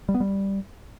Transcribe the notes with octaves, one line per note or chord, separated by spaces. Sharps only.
G3
B3
G3